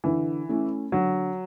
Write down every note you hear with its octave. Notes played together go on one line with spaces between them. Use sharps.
D3 E3
A3 C#4 E4
D3 F#3